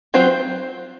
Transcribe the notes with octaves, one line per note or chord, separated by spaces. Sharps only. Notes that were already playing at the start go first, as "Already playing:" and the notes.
F#3 C4 F4 C5